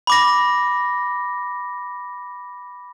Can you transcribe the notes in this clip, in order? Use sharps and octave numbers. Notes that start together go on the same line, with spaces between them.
B5 D6 A#6